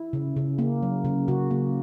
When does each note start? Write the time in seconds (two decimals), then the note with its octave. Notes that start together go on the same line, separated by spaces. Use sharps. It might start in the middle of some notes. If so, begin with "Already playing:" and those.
Already playing: E4
0.13 C#3
0.37 C#3
0.58 A#3
0.82 F#3
1.05 C#3
1.28 C#3 F#4
1.51 A#3